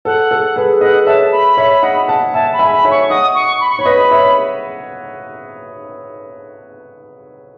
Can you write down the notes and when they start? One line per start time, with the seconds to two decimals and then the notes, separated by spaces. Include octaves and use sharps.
0.05 A4 F#5
0.31 A4
0.56 G#4 B4
0.81 B4 D#5 F#5
1.07 C#5 E5 A5
1.32 B5
1.57 C#5 E5
1.83 D#5 F#5
2.08 F#5 A5
2.33 E5 G#5 A5
2.53 B5
2.59 E5 G#5
2.72 B5
2.85 C#5 E5
2.91 C#6
3.09 D#5 F#5 D#6
3.35 C#6
3.61 B5
3.69 C#6
3.79 C#5 B5
3.85 B4 D#5
4.11 C#5 E5